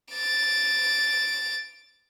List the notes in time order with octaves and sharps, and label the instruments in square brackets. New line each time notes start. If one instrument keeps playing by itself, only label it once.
[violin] A6 D7